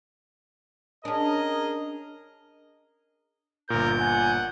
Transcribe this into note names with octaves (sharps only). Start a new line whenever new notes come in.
C#4 D4 G#4 A#4 D#5
G1 A#2 A#4 G6
F#5 G#5